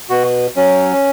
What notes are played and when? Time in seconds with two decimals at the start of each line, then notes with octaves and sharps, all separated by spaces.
0.09 B2 F#4
0.56 F#3 C#4